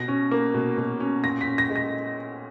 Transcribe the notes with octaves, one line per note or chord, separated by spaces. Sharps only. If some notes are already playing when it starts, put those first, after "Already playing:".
Already playing: B2 A#6
C#4
A#3
B2
B2
C#4
A#2 A#6
B6
C#4
A#6
G#3
A#6